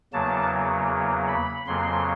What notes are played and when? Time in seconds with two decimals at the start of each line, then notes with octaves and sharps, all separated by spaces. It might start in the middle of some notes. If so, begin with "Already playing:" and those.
0.13 E2 C#3 F#3 A#3 A5
1.28 B5
1.67 F2 C#3 F#3 A#3 C6